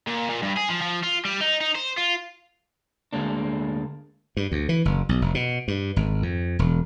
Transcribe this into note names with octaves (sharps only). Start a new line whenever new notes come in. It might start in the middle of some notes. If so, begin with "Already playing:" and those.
A#2
A#2
G2
G#4
F3
F3
F4
G3
D#4
D#4
C5
F4
D2 G#3 A#3 D4
G2
D2
E3
F#1
B1
F1
B2
G2
G#1
F2
E1